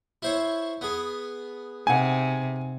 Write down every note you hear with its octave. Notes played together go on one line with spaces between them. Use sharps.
E4 C5 C#5
B3 G#4
C3 D#4 F#5 G#5